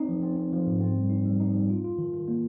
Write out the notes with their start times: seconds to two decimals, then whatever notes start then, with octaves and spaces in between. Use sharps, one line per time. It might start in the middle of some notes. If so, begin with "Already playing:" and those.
Already playing: C4 D#4
0.09 F3
0.23 C4
0.37 C4
0.53 F3
0.67 G#2
0.81 C4
0.96 G3
1.10 D#4
1.25 G3
1.40 D#4
1.54 G3
1.70 F4
1.84 F4
1.98 D#3
2.14 D#3
2.28 A#3